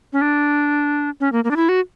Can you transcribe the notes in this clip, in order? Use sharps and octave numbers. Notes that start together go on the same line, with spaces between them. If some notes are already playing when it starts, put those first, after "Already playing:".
C#4
D4
C#4
A#3
A#3
D4
E4
F#4